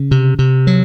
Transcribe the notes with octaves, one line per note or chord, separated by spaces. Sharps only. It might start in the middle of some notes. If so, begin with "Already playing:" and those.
Already playing: C#3
C3
C3
F#3